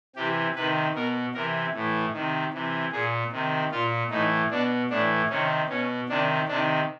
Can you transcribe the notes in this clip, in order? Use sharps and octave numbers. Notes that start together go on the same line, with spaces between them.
C3 E3 G4
C3 D#3 B4
B2 A#4
C3 E3 A#4
A2 E3
C3 D#3
C3 E3
A#2 G#4
C3 D#3
A#2 F4
A2 E3 D#4
B2 D4
A2 E3 D4
C3 D#3 C#4
B2 C#4
C3 D#3 D4
C3 D#3 D4